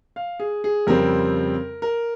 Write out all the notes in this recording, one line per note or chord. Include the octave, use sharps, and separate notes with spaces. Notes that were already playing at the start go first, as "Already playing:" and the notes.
F5
G#4
G#4
F2 C#3 G3 C4 A#4
A#4